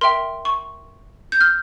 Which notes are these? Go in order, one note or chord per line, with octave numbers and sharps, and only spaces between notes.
A#4 E5 G5 C6
C#6
G6
F6